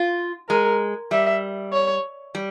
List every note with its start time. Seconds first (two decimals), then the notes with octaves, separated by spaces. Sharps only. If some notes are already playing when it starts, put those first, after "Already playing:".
Already playing: F4
0.49 G#3 A#4
1.11 G3 E5
1.73 C#5
2.35 G3